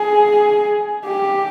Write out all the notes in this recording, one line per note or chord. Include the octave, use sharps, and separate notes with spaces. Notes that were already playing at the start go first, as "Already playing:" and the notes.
Already playing: G#4
G4